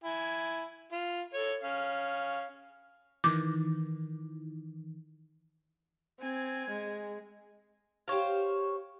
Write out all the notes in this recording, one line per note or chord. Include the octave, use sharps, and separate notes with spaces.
E4 G#5
F4
A4 C#5
C#4 F5
D#3 E3 D6
C4 G#5 G#6
G#3
G4 C5 C#5 F5